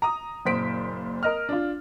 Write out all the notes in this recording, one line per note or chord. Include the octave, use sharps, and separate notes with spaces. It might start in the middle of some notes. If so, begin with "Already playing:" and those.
A#5 D#6
F#1 A#2 C5 B6 D7
A#4 D#5 F6
D4 F4